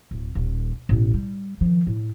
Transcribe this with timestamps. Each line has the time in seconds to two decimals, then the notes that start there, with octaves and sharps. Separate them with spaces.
0.11 D1
0.35 D#1
0.89 A1 B2
1.14 G3
1.61 D#3 F3
1.87 A2